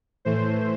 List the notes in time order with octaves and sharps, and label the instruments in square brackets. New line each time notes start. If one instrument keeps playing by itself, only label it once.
[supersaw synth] A2 E3 A3 C5